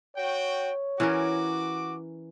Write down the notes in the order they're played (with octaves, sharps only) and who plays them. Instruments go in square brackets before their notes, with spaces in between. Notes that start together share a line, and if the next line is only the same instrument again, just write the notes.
[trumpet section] F#4 G5 [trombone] C#5
[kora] E3 C#4 A#4 [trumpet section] F#4 D6